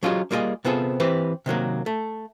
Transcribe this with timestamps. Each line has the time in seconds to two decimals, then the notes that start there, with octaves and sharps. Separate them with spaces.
0.03 F#3 C#4 F4 G4 G#4 D#5
0.31 G3 A#3 E4 F4 G#4 D#5
0.64 C3 B3 C4 F4 G#4 A4
1.00 E3 C4 G4 B4
1.46 C3 D#3 F#3 A#3
1.86 A3